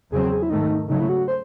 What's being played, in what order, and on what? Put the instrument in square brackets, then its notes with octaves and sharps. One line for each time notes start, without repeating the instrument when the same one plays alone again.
[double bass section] E2 C#3 F#3 C4 [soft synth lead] G#4
[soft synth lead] G#4
E4
[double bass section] G#2 D#3 A3 [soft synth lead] D#4
[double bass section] C#3 F#3 A3 [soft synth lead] D#4
[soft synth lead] E4
F#4
C5